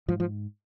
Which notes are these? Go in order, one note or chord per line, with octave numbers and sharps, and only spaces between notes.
G#2 F3
F3